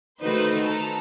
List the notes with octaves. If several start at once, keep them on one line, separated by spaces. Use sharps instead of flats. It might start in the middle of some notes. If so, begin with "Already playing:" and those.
D#3 A3 D#4 F#4 B4 C5
A4 A#5